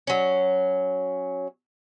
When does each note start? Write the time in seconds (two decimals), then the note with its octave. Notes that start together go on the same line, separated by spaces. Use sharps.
0.07 F#3 C#4